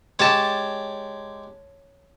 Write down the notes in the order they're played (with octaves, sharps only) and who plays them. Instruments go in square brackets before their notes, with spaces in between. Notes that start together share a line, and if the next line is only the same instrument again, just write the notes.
[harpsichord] G#3 G4 [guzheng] C#5 A5